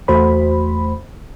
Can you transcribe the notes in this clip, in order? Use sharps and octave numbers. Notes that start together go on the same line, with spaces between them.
E2 A3 F#4 C5 B5